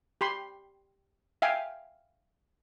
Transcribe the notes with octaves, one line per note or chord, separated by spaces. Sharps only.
G4 B5 C6
E5 F5 G5 G#5